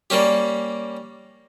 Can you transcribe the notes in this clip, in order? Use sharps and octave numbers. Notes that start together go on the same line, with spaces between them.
G3 A#3 C#4 G4